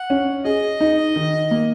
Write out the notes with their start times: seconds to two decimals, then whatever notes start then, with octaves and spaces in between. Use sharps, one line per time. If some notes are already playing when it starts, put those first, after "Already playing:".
Already playing: F#5
0.10 C#4
0.45 G#4 D#5
0.81 D#4
1.16 D#3
1.51 A#3